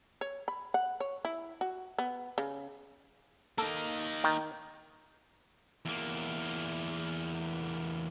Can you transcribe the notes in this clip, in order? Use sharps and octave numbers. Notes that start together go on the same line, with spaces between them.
C#5
B5
F#5
C#5
E4
F#4
B3
C#3
A#3 D#4 A4
D#3
E2 A#3